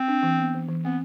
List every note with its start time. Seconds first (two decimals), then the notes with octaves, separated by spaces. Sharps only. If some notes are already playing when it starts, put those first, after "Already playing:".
Already playing: C4
0.08 D4
0.23 E3
0.39 B3
0.54 E3
0.68 E3
0.85 B3 C4